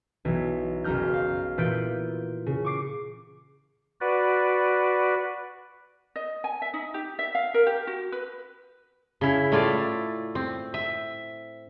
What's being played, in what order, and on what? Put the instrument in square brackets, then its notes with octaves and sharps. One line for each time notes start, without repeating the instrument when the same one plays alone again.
[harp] B1 E3
F#1 B1 A#5 F6 G6
F5
A#2 E3 F4 B4 G6 D7
C#3
C#6 D6 C7
[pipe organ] F#4 B4 D5
[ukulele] D#5
G#5
E5
D#4
G4
E5
F5
A#4
G4
F#4
B4
[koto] C#3 E4
A2 A3 E4 F4 D5
C4
E5